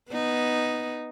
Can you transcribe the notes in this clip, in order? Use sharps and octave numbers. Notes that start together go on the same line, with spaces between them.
B3 D#4